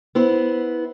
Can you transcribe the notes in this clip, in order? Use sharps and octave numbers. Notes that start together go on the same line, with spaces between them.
B3 E4 C5